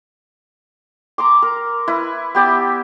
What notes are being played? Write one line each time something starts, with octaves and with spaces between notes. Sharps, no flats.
A#5 C6 D6
A#4
E4 B4
B3 G4 D5 E5